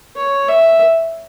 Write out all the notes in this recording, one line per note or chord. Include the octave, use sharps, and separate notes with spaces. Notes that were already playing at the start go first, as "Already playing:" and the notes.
C#5
E5